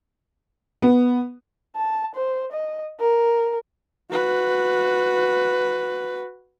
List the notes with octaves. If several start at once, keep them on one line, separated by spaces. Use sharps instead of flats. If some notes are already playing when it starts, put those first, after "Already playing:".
B3
A5
C5
D#5
A#4
F#4 B4